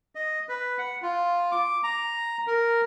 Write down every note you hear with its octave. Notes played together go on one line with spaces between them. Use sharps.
D#5
B4
F#5
F4
D6
A#5
A#4